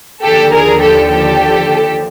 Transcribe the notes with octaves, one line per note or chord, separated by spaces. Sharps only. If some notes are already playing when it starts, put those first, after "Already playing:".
D#2 D3 F3 G4 A4
G#4 A#4
G4 A4
G4 A4